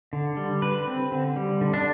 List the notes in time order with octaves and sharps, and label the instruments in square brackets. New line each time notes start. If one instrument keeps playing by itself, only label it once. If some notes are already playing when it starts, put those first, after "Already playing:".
[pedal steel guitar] D3
G3
D3 B4
C4
D3
G3
D3
D4